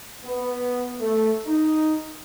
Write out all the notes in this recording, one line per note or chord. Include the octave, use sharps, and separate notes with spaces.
B3
A3
D#4